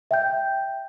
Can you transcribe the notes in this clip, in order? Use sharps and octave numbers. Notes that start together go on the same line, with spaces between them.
E5 G5 G6